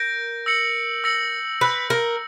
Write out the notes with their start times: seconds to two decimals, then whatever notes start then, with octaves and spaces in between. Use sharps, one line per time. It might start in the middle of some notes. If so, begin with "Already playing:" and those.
Already playing: A#4 G6 A#6 D7
0.46 E6 A#6 C#7 F#7
1.04 E6 A#6 C#7 F#7
1.61 B4 E6 G6 A#6
1.90 A#4